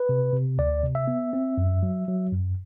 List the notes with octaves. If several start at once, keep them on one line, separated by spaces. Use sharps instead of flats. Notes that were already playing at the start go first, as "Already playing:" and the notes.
Already playing: B4
C3
C3
D2 D5
C3
E5
B3
C4
F#2
F#3
F#3
F#2